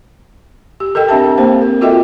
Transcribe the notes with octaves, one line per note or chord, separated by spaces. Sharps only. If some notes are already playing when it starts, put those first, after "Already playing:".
G4
A4 A#4 D#5 G5
C4 D4 G4 E5 A5
A#3 C4 C5 F5
A#4
F4 F#4 A4 D#5 E5 G5